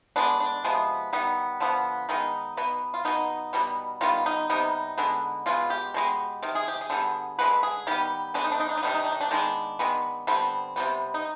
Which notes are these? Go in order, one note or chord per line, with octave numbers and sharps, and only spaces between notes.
D3 G#3 B3 D4
D4
C3 F3 G#3 B3
D#3 G3 B3
D3 F3 B3
D#3 G#3 B3 D#4
B2 B3
F4
B2 B3 D#4
B2 G3 B3
D#3 G3 B3 F4
D#4
C3 G3 B3 D#4
D3 G#3 B3
B2 G#3 B3 F4
G4
B2 G#3 B3
C3 D#3
G#4
G4
G#4
D3 G3 B3
D3 G#3 B3 B4
G#4
D#3 G3 B3 G4
D3 G#3 B3 D4
D#4
D4
D#4
D4
D#4
C3 D#3 G3 B3 D4
D#4
D4
D#4
D4
D#3 G#3 B3 D4
D#3 G#3 B3
D3 G3 B3 C4
C3 G3 B3
D#4